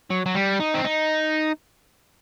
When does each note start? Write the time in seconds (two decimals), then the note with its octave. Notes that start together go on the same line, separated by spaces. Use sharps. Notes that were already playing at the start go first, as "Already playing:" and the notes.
0.10 F#3
0.26 F#3
0.35 G3
0.60 D#4
0.74 C4
0.85 D#4